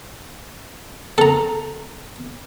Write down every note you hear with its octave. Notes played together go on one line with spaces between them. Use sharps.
A4 A#5